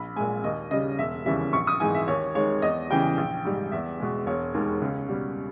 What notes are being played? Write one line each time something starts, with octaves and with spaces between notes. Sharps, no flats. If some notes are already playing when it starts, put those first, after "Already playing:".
Already playing: A#1 B5
A#2 G#3 G#5
D#2 D#5
C#3 G3 D#5
E1 E5
D#2 C#3 E3 G3 E5
A#1 C#6
D#6
G#2 E3 G#3 G#5
E5
D#2 C#5
D#3 G#3 C#5
E2 D#5
C#3 E3 G3 G5
A#1
G#2 G3
E2 E5
B2 G#3
E1 C#5
D#2 D#3 G#3
C#2
B2 G3